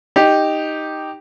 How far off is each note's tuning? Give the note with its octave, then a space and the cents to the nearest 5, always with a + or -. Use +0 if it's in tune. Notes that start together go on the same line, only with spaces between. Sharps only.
D#4 +0 G4 +0